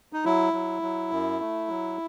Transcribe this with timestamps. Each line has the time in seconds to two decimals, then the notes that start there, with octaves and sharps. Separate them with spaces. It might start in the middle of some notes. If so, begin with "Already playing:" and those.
0.13 D#4
0.25 F#3 E4
0.53 F#3
0.82 F#3
1.11 F#2
1.40 A3
1.68 F#3